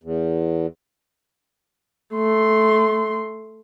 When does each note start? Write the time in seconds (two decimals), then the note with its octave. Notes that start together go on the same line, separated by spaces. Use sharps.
0.03 E2
2.14 A3 C6